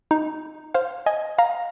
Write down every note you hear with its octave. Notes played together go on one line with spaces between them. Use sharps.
D#4
C5 F5
D#5 G#5
F5 A#5